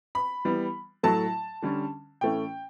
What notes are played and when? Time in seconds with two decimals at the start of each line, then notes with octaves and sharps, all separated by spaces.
0.15 B5
0.45 E3 G3 B3
1.03 A2 F#3 A3 A5
1.62 D3 G3 C#4
2.21 A2 E3 A3 C#4 G5